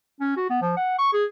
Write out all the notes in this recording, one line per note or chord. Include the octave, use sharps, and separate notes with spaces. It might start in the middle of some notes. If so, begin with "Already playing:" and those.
C#4
F#4
B3
F3
F#5
C#6
G#4